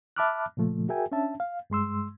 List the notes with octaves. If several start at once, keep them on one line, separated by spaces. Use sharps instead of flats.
E5 A5 B5 D6 F6 F#6
A#2 C#3 F3 A3
F#4 G#4 A#4 E5 G5 G#5
C#4 D4 E5 A5
F5
G2 G#3 C6 E6